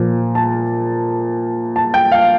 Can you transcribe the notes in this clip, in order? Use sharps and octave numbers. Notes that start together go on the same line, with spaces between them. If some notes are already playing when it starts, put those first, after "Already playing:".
Already playing: A#2 F3
A5
A5
G5
F5